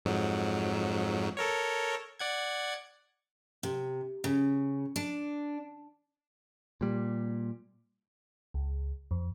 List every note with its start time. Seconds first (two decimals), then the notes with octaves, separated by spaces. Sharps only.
0.05 F2 G#2 F#3
1.37 A4 A#4 C#5
2.19 D5 F#5 G#6
3.63 C3
4.24 C#3
4.96 D4
6.81 A#2 G3
8.54 C#2
9.11 F2